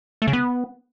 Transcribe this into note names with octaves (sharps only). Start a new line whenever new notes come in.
A3
C#3
B3